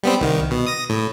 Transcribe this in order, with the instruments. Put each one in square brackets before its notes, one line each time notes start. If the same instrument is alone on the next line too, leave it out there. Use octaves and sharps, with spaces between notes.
[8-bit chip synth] G3 B3 C4
C2 D#3
B2
D#6 A#6
A2